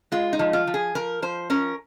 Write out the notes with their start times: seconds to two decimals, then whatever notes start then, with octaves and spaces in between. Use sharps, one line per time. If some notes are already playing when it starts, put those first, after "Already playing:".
0.12 G#3 F4
0.33 D#4
0.39 F3
0.53 F4
0.67 F3
0.74 G#4
0.95 F3 A#4
1.22 F3 C5
1.50 C#4 A#4